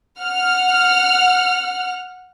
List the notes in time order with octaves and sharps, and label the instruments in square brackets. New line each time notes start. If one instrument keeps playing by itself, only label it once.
[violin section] F#5 F6